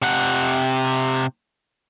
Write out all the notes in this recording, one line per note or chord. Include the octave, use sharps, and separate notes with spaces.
C3 F#5